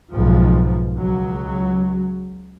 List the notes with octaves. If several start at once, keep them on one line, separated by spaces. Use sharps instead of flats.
B1 G#2 F3
C#2 F#3